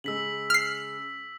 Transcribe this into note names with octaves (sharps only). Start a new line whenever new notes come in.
C#3 G#3 E6 B6 F#7
F6 C7